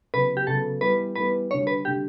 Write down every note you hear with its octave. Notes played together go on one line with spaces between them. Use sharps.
C#3 F#3 B3 B4
G4
C#3 F#3 B3 A4
E3 G3 B3 B4
E3 G3 B3 B4
D3 G3 D4 F#4 C#5
B4
D3 G3 D4 F#4 G4